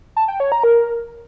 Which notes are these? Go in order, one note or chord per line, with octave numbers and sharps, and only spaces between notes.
A5
G5
C#5
A#5
A#4